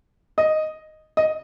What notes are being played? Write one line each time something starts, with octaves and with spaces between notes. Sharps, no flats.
D#5
D#5